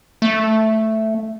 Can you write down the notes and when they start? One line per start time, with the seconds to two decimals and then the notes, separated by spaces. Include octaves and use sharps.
0.22 A3